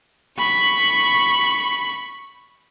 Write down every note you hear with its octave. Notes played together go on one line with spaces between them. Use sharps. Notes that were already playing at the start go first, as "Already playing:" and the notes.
B5 C#6